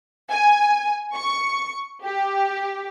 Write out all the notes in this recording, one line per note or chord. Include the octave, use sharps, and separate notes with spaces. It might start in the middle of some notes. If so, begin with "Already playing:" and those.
G#5
C#6
G4